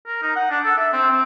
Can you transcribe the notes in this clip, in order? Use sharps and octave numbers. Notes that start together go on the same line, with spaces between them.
A#4
D#4
F#5
D4
A4
E5
C4
C4